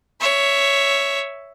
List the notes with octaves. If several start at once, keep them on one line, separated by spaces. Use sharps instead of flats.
C#5 E5